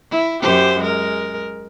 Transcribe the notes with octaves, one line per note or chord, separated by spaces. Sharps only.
E4
F#2 G4 C5
G#3 A#4